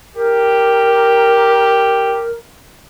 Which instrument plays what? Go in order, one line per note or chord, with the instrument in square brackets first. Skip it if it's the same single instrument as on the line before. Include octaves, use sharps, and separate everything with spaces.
[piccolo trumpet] G4 [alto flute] A#4